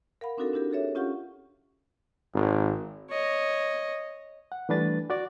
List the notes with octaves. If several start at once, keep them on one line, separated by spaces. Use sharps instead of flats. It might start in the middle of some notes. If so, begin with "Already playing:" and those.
A#4 F5 F#5 B5
C4 D4 D#4 F#4 A4 A#4
D4 E4 G4 A#4
F#4 G#4 A4 C#5 E5
C#4 F4 G4 F5 F#5 C#6
G#1
C#5 D#5
F#5
E3 G3 A3 D4 B4 A6
F#4 D5